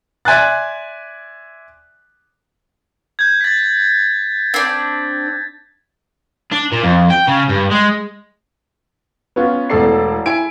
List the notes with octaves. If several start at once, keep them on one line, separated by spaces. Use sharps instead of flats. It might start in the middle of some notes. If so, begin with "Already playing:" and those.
D5 E5 G#5 C6 F#6 A6
G6 G#6
A6 B6
C4 D4
D4
A#2
F2
G5
C#3
G2
G#3
B3 C#4 F4
E1 E2 A3 A4 D5 C7
E4 G#5 D7